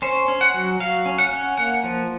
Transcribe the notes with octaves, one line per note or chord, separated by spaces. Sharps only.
C#4 C5
C#4
F#5
F#3
F#3 F5
C#4
F#5
C#4
A#3 F#5
F3